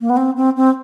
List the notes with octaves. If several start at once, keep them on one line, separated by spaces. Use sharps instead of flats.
A#3
B3
C4
C4
C4